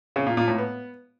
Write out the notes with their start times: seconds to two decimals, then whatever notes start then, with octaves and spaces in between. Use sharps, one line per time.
0.16 C#3
0.26 A#2
0.37 A#2
0.48 A2
0.58 B3